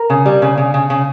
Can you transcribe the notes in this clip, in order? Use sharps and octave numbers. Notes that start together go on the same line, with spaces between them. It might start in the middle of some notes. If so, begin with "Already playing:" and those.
Already playing: A#4
C#3
G3
C#3
C#3
C#3
C#3